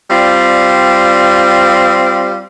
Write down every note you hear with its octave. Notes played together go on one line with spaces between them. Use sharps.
G3 C4 F4 D5